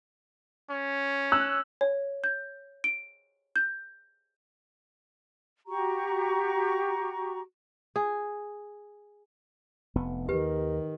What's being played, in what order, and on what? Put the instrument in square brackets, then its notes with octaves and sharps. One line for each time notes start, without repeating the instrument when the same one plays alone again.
[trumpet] C#4
[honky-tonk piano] E6 F#6
[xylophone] C#5
G6
D7
G6
[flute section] F#4 G4 A#5 C#6
[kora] G#4
[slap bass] F1 B3
[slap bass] D#2 [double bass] D#3 [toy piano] G4 B4